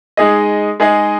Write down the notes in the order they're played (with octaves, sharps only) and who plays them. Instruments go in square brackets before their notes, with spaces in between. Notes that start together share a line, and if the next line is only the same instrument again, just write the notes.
[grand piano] G#3 D#4 G#4 D#5
G#3 D#4 G#4 D#5